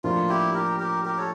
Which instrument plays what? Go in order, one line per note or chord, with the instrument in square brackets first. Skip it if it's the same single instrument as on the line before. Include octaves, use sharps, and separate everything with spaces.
[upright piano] A2 F3 A#3 D4 [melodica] F4
[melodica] E4 G4
G4 A#4
G4 A#4
G4 A#4
A4 C#5